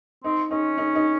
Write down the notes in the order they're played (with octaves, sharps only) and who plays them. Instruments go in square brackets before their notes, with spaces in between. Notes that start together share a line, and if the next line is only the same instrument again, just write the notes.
[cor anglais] C4 [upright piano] D#4
[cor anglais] C#4 [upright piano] D#4
[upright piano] D#4
D#4